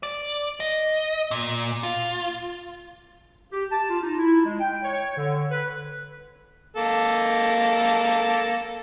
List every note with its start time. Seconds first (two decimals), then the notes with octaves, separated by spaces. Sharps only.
0.03 D5
0.60 D#5
1.31 A#2
1.83 F4
3.53 G4
3.72 A5
3.89 F4
4.02 D#4
4.18 E4
4.45 G#3
4.59 G5
4.83 C#5
5.17 D3
5.51 B4
6.77 A#3 A4